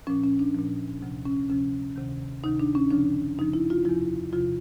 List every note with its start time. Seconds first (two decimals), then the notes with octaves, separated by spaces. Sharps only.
0.07 A#2 F3 C#4
0.24 C#4
0.39 D4
0.54 A#2 F3
1.02 D2 C3 F3
1.25 C#4
1.49 D2 C3 F3 C#4
1.96 D2 C3 D#3
2.44 D2 C3 D#3 D#4
2.59 D4
2.75 C#4
2.91 F#2 C#3 F3 D4
3.38 F#2 C#3 F3 D#4
3.53 E4
3.70 F4
3.85 E2 C3 F3 E4
4.33 E2 C3 F3 F4